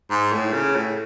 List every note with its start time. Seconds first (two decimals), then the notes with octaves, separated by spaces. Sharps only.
0.10 G#2
0.32 A2
0.53 C#3
0.75 A2